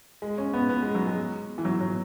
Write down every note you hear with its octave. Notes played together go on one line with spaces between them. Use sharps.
G#3
C#4
B3
B3
G#3
F#3
G#3
E3
F#3
F#3